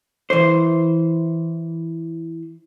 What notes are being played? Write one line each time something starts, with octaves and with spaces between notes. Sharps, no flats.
E3 C5